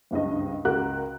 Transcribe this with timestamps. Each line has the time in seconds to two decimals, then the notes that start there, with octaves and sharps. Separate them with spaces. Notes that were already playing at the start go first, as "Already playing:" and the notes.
0.11 F#1 C#2 G2 D#5
0.65 C#2 F#4 A#4 F#6